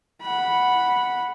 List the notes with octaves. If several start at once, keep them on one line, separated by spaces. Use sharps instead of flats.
F#5 B5